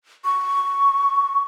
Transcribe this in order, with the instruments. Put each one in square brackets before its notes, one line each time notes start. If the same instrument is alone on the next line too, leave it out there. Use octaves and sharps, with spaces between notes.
[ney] C#6